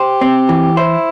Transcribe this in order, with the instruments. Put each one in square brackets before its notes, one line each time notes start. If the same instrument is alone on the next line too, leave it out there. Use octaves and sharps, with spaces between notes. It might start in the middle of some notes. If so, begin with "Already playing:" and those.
Already playing: [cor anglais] G4 [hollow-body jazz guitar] C5
[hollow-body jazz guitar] C4
E3
[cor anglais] E4 [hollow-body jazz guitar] C5